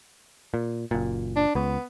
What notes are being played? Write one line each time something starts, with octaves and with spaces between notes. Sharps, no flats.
A#2
F#1 A#2
D4
C#2 B3